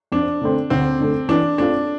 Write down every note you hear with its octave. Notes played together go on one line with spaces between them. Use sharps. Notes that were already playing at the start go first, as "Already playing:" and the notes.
F2 D4
D3 A3 C4
D2 C4
D3 A3
E3 D4
A3 C4 D4 F4